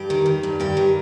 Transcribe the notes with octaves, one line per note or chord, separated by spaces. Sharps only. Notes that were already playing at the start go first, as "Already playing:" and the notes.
Already playing: G2 G4
D#3
D#3
G2
G2 G4
D#3